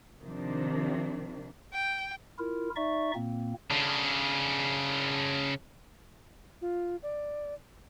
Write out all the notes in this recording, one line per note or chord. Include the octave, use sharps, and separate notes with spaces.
C3 D#3 F3 D4
G5
E4 F4 A#4
D#4 D5 E5 C#6
A#2 A#3 C4
C#3 D4
F4
D5